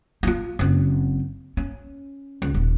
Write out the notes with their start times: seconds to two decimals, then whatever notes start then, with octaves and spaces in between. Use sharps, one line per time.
0.23 D#4 F4
0.59 F#1 C4
1.57 C#4
2.42 C#2
2.54 D#1